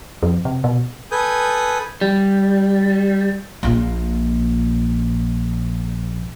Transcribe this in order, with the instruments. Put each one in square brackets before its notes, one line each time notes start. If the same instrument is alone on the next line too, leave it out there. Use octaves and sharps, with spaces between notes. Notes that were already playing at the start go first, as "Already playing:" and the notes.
[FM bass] F2
C3
B2
[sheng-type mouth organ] A4 B4 G#5 D#6 G6
[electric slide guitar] G3
[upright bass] A#1 A#2